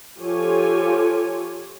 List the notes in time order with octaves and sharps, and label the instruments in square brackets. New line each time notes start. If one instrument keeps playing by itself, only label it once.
[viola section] F3 F4 G4 A4 C#5 G#5